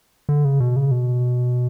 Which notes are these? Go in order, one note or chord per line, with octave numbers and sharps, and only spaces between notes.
D3
C#3
B2
C#3
B2